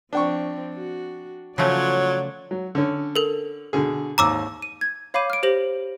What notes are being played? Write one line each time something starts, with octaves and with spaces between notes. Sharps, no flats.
F3 C4 D4 G5 C#6
F#4
C#3 F3 F#3 A3 F4 C#5 D5
F#3
D3 C#4
A4 A#4
B2 D3 G#4
G#1 D#2 A#5 D6 E6
D#7
G#6
C#5 F5 B5 D6 G6 D#7
F6 D7
G4 C5 A#6 F#7